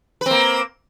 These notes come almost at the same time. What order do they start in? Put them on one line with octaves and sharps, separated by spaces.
B4 C4 A#3